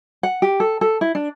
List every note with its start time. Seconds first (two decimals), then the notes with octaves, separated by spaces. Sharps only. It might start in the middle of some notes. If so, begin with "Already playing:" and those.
0.23 F#5
0.42 G4
0.60 A4
0.81 A4
1.01 E4
1.15 D4